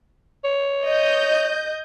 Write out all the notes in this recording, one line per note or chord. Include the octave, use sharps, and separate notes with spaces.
C#5
D#5 G6